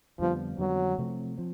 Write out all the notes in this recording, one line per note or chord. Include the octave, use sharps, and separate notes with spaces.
F2 D3 F3 G3 B3
F2 D3 F#3 G3 B3
C3 F3 A3 C4
F3 C4